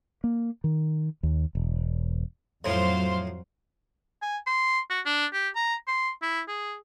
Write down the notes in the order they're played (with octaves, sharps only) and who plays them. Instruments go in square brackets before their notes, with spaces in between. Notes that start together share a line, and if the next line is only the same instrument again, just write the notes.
[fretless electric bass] A#3
D#3
D#2
E1
[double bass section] F2 F#3 [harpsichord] A2 F3 [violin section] C5 F5 C6
[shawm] G#5
C6
F#4
D4
G4
A#5
C6
E4
G#4